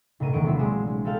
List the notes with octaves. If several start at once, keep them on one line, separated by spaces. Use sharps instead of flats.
B1 A2 C3 A#4 D#7
E1 B1 D#3 A#3 C#6 D7
C3 F#3 C4 D4 E4 B4
A#1 F#3 G#3 D6 D7 E7
G#3
B3 C4 G4 A4 F5